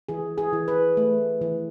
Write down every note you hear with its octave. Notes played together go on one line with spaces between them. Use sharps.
E3 G#4
G#4
E3
B4
A3
E3